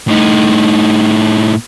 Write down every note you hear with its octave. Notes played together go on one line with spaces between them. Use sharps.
A2 D#4